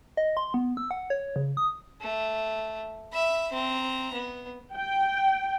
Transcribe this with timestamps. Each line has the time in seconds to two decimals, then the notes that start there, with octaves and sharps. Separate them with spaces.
0.17 D#5
0.37 C6
0.54 B3
0.77 E6
0.91 F#5
1.10 C#5
1.36 C#3
1.57 D#6
2.01 A3
3.13 E5 B5
3.52 C4 A#5
4.13 B3
4.74 G5